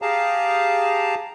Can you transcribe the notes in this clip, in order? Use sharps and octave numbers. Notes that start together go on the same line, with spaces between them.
G4 G#4 F5 A5 A#5